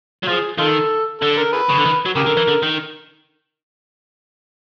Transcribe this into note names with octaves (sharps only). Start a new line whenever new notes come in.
F#3
F3 F4 G#4
D#3 F4 A4
D3 A4
A#4
G#4 B4
C#3
D3
D#3
F#3
C#3 G4 A#4
D3
E3
D3
D#3